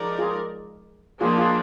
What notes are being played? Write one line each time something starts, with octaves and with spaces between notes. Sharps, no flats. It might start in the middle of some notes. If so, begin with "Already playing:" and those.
Already playing: F3 G#3 D#4 A#4 D5
F4 G#4
F3 A#3 D4 F4 G#4
F4 G#4